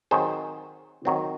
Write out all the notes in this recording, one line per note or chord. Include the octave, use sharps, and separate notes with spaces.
D#3 F#3 C4 G#4 C5
D#3 F#3 C4